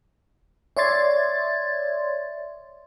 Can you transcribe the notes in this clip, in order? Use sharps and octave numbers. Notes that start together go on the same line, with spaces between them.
C#5 D5 E5 C6 G#6 A6